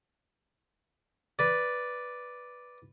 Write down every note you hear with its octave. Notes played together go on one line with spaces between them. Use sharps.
B4 D5